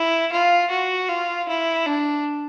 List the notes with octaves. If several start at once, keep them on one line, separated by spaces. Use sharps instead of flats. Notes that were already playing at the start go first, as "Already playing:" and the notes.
Already playing: E4
F4
F#4
F4
E4
D4